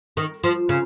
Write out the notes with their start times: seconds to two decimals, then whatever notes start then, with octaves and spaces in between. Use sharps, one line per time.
0.17 D#3
0.44 F3
0.69 C#3